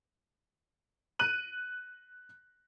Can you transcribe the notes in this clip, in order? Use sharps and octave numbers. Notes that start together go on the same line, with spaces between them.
F#6 D#7 F#7